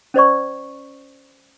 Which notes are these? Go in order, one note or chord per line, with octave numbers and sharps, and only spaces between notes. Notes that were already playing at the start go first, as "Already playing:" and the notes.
C#4 C5 D5 C#6